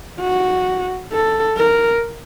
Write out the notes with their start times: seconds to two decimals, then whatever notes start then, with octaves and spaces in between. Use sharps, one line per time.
0.21 F#4
1.12 A4
1.57 A#4